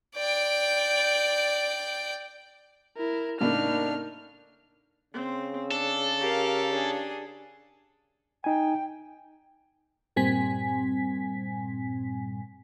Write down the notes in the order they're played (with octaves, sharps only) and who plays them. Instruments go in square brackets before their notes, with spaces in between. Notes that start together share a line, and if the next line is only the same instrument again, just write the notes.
[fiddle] D5 G5
[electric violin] E4 A#4
[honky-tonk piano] A2 C#3 A#3 [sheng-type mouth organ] D4 [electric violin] D#4 F6
[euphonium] C#3 [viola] C4
[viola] D4 [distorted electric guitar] A4
[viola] G4 [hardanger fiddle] A#4 F5
[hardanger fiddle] D4 G#4
[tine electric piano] D#4 G#5 [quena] G5
[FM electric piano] G2 A#2 G3 C4 G#5 B6